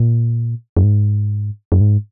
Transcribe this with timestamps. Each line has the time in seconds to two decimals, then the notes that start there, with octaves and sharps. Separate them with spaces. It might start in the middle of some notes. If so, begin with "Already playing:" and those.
Already playing: A#2
0.77 F#2
0.84 G#2
1.72 F#2
1.81 G#2